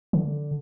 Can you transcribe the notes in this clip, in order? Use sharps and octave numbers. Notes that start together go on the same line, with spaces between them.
D3